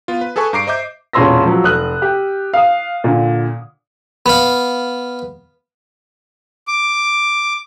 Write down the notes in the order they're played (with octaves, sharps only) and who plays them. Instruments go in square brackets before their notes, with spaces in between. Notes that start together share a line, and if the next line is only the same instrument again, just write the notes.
[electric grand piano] B3 F4
B4
G#4 A4 B4 G#5 C#6
G2 A#5 D6 C7 D7
C5 D#5 E5 D6 G6
[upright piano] E1 A#2 C#4 C6 E6 A#6
F3 F#3
F1 D#6 F6 F#6
G4
F5 D#6
A#2 D3
[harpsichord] B3 F5
[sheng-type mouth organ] D6